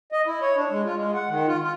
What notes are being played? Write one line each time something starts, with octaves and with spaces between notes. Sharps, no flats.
D#5
E4
C#5
D4
G#3
F4
G#3
F#5
D#3
F4
F4